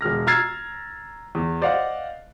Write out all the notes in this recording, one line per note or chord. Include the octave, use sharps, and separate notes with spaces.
E1 G#3 F6 A#6
A#5 E6 F6 G#6 A6 C7
E2
C5 D5 D#5 F5 F#5